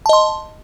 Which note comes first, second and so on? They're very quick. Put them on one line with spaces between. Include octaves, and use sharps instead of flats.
A5 D#5 C6